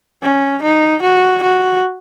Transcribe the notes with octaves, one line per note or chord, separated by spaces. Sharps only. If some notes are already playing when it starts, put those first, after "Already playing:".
C#4
D#4
F#4
F#4